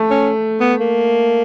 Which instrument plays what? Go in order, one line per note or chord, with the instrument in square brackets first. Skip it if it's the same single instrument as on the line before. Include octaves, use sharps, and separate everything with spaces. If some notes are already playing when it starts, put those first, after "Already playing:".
Already playing: [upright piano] A3
[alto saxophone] C#4
B3
A#3